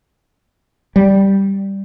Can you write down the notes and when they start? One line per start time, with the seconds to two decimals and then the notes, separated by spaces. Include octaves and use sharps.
0.96 G3